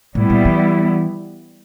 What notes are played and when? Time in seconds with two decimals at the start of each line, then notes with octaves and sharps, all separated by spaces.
0.15 A2 G3 B3 E4
0.30 A#2
0.45 E3